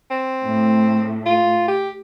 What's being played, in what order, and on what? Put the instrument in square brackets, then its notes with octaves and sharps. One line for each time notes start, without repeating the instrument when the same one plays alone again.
[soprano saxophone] C4
[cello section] A2 A3
[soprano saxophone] F4
G4